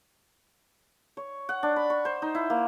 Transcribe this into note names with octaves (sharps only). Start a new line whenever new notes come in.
C#5
F#5
D4
B5
C#6
C5
D#4
E4
A#3